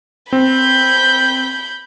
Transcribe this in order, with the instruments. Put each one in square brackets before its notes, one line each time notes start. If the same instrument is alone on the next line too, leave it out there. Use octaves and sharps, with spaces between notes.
[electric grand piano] C4 [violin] B5 G6